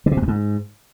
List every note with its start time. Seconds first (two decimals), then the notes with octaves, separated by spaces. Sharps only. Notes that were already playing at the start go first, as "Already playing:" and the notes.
0.06 D3
0.11 C3
0.17 A2
0.22 F2
0.28 G#2